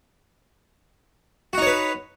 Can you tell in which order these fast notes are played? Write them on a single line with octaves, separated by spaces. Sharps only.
F#4 D#4 C#5 B4